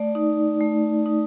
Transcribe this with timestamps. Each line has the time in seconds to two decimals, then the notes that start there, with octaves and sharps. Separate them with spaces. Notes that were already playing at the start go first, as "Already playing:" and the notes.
Already playing: A3 D5
0.15 D#4
0.60 A3
1.06 D#4